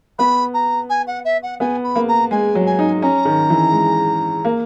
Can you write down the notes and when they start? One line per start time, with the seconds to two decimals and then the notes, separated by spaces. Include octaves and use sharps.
0.18 B3 B5
0.54 A#5
0.89 G#5
1.07 F#5
1.25 E5
1.42 F#5
1.60 B3 G#5
1.84 B5
1.96 A#3
2.08 A#5
2.31 G#3 G#5
2.55 F#3
2.66 G#5
2.79 D#4
3.02 C#4 A#5
3.25 D#3
3.50 E3
3.72 G#3
4.45 A#3